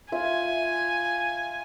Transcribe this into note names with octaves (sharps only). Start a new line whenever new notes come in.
F4 E5 G#5